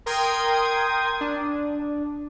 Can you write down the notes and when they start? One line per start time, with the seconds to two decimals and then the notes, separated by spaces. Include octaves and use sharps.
0.06 A#4 G5 C6 D#6 G#6
1.21 D4